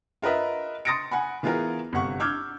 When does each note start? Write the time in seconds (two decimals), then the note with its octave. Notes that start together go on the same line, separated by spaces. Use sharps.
0.22 F4 A#4 B4 D#5 E5
0.85 C6 D#6 A6 A#6 C#7 D7
1.11 F#5 G#5 B5
1.43 E3 B3 F4 G#4 A#4
1.93 G1 C3 F#5 C#6
2.20 D6 E6 F6 G6 G#6